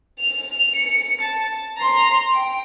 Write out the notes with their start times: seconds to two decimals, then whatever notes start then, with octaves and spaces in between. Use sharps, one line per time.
0.20 F7
0.76 C#7
1.21 A5
1.78 A#5 C6
2.34 G5